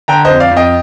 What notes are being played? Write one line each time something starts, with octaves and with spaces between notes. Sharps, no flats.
D3 G5 A#5
C5 D#5
F2
D5 F5
F2
D#5 G5